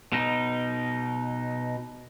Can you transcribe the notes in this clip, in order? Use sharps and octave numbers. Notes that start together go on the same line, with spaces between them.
B2 D#4